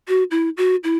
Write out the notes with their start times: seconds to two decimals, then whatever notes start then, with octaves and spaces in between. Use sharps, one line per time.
0.08 F#4
0.31 E4
0.57 F#4
0.84 E4